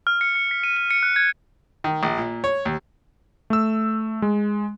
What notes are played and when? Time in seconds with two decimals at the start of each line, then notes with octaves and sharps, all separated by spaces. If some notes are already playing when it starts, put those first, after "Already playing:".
0.07 F6
0.21 C#7
0.35 C#7
0.51 B6
0.64 D#7
0.77 D#7
0.91 C#7
1.03 F#6
1.16 G#6
1.84 D#3
2.03 A#1
2.18 A#2
2.44 C#5
2.65 D#2
3.50 A3 E6
4.22 G#3